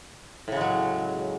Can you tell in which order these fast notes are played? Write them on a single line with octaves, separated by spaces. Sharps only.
A2 C#3 G#3 F#3